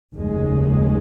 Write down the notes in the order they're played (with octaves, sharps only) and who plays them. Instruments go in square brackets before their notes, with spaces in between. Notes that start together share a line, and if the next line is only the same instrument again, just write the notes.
[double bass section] F1 D#2 C#3 G#3